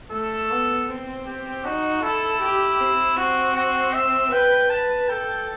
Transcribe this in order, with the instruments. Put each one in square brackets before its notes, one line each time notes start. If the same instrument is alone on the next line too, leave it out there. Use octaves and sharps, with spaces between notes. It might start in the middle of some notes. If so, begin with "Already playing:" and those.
[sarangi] A3 [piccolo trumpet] A4
[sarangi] B3
C4
[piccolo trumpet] G4
[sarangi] D#4 [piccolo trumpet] F#4
[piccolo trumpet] E4 [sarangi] A4
[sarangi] G4
C4
[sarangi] C4 [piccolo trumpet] F#4
[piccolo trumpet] F#4
E5
[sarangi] B4 [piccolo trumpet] G5
[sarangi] B4 [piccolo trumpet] A5
[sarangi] A4 [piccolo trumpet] G5